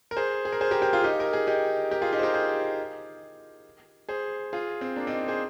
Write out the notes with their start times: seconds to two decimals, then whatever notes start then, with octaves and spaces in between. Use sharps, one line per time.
0.11 A#4
0.16 G#4 C5
0.45 G#4
0.52 A#4
0.61 G#4 C5
0.71 G4 A#4
0.82 G4 A#4
0.93 F4 G#4
1.04 D#4 G4
1.20 A#4
1.33 G#4
1.47 D#4 G4
1.91 G4 A#4
2.02 F4 G#4
2.13 D#4 G4
2.19 C5
2.23 G4 A#4
2.34 G#4 C5
4.09 G#4 C5
4.53 F4 G#4
4.81 C4
4.96 A#3 D4
5.07 C4 D#4
5.28 G#4 C5